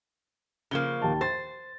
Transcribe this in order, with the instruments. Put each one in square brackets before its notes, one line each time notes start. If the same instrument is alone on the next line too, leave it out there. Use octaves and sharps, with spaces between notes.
[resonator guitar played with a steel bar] C#3 F3 A#3 [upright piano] G7
[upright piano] D#2 A5
[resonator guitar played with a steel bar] C5 [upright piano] A6